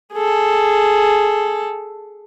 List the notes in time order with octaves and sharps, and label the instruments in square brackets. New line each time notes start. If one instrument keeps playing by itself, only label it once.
[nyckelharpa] G#4 A4